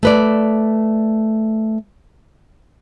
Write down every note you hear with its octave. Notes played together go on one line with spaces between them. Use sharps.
A3 B4 D5